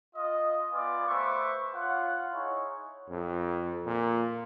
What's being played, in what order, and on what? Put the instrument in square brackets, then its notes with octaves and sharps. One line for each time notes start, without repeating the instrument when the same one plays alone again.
[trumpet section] F4 D#5
B3 F4 B4 D5 G#5 D6
A3 B4 C5 E5 C#6 D6
F4 C#5 F#5
D#4 E4 G#4 C#5
[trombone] F2
A#2